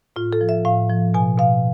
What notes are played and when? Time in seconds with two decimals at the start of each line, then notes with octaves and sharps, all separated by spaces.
0.16 A2 F4
0.33 A4
0.41 F3
0.49 E5
0.65 A2 F5
0.90 F3
1.14 B2 G#5
1.38 B2 F5